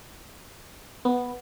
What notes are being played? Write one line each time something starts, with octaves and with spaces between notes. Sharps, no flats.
B3